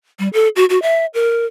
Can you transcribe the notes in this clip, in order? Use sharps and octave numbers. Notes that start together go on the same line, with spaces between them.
G3
A4
F#4
F#4
E5
A#4